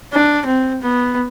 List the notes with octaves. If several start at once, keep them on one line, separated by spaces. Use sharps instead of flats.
D4
C4
B3